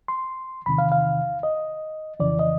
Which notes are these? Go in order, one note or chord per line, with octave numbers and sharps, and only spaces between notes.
C6
E2 C3 D#3 B5
F5
F5
D#5
F2 C#3 E3 D5
D#5